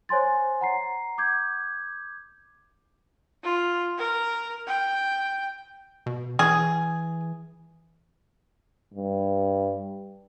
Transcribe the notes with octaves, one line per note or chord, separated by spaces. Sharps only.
C5 C#5 G#5 C6 A6
F#5 A#5 C7
D6 G6 G#6
F4
A#4
G5
B2
E3 G#4
G2